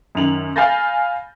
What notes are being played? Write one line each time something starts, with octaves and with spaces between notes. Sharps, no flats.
F#2 D#3 F7 F#7
F5 G#5 B5 G6 A6 A#6